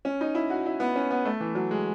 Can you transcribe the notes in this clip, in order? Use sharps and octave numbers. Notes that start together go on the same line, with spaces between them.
C#4
D#4
E4
F#4
E4
B3
C#4
B3
A3
E3
F#3
G#3